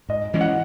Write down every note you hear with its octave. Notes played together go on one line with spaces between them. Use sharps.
G#2 D#5
E3 G#3 C#4
F#5